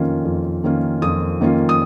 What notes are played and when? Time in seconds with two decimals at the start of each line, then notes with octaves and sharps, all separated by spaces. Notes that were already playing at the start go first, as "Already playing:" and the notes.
Already playing: F2 D#3 A#3 C#4 F4
0.25 F2
0.64 D#3 A#3 C#4 F4
1.02 F2 D#6
1.41 D#3 A#3 C#4 F4
1.69 D#6